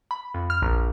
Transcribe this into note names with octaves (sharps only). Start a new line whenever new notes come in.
B5
F2
F6
A#1